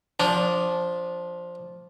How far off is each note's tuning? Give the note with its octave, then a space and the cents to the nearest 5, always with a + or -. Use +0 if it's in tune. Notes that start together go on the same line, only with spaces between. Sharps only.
F3 +5 D4 -15